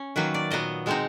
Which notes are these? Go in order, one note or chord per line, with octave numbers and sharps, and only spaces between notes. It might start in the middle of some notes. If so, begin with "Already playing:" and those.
Already playing: C#4
D#3 F#3 A#3 B4
D5
A#2 F#3 B3 D#5
B2 G#3 C4 D#4